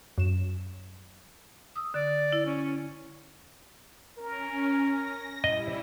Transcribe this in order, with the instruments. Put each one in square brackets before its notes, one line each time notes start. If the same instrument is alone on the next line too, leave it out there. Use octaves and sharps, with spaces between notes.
[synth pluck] F#2 E7
[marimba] D#6 E6
[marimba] D3 [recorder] D5
[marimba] E4
[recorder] C#4
[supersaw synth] C#4 [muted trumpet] A#4
[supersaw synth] A#6
[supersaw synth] G3 E4 [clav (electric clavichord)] D#5